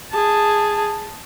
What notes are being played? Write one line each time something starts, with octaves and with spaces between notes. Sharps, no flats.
G#4 A5